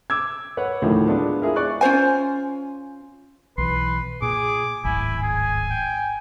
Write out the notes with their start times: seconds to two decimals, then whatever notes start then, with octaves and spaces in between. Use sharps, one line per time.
0.10 D6 E6 G#6
0.57 B4 C#5 F#5
0.82 D2 A2 D#3 F3
1.07 G#3 B3 D4 F4
1.41 E4 F4 G#4 A#4 E5
1.56 D5 C#6 F#6
1.81 C#4 F4 C5 G#5
3.58 B1 E3 B4 C6
4.22 A#2 G#4 D6
4.84 D1 G#1 E4 G#5
5.22 G#4 G#5
5.70 G5